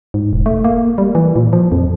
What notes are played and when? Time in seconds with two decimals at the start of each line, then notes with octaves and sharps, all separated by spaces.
0.14 G#2
0.33 E1
0.46 A3
0.64 A#3
0.98 G3
1.15 E3
1.36 A#2
1.53 F3
1.72 F2